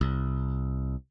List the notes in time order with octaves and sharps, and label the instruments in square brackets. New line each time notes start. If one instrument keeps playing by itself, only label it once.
[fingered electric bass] C2